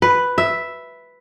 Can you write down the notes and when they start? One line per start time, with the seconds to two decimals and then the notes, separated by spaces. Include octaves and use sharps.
0.02 B4
0.38 E5